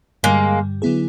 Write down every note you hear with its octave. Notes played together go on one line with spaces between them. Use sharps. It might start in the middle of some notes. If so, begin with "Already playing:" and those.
G2 D3 G3 G#3 A#3
D3 F#3 B3 E4 G#4